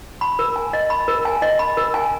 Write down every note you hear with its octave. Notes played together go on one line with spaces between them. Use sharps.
B5
A#4
G#5
D#5
B5
A#4
G#5
D#5
B5
A#4
G#5